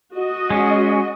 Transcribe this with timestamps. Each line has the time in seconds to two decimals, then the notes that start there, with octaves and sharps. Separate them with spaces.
0.15 F#4 D#5
0.51 G#3 C#4